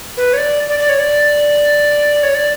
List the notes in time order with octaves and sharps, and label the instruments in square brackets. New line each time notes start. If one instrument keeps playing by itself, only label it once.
[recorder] B4
C#5
D5
D5
D5
C#5
D5
C#5
D5